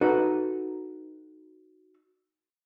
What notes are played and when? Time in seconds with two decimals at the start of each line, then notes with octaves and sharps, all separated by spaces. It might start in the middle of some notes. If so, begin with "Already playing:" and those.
0.01 D#4 F#4 A4 B4